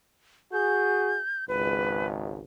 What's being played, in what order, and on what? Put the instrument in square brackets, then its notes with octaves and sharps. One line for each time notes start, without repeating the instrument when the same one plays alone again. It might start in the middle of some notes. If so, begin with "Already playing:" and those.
[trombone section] F#4 G#4 [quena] G6
[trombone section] G#1 C#2 [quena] B4